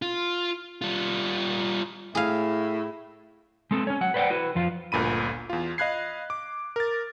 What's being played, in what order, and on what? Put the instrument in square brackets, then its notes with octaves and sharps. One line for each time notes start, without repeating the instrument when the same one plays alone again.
[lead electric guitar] F4
G3 F4
[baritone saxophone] A2 [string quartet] E4 [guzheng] G#4 F5
[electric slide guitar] G#3 C4 A4
C#4 C#5
F#3 F#5
B4 C5 D5 E5 F#5 G5
E4 F#4 B4
F2 F3 F4
[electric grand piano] G1 D2 A#2 B5 D#7
E2 F4
D#5 F5 B5 F#6 G#6 C7
D6
A#4 A6